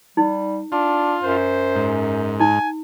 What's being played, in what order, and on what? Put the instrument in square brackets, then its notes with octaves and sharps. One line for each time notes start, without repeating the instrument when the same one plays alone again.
[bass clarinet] G3 [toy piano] D#4
[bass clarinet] D4 [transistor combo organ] F4
[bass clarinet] F#2 [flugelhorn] C5
[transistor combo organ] G#2
[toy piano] D#4 [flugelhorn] G#5